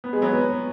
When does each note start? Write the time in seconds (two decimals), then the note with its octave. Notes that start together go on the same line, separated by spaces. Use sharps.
0.04 B3
0.13 G#3
0.22 F#3 B3